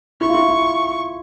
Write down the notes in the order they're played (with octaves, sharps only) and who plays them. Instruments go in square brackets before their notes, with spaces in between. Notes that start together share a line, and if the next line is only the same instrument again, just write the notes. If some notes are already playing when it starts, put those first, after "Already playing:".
[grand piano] E4 [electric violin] C#6
[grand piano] F4
E4
F4